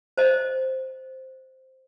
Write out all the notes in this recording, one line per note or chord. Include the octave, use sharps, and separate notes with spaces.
C5 D#5